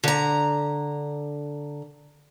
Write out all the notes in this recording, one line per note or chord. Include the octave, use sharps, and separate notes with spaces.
D3 A#5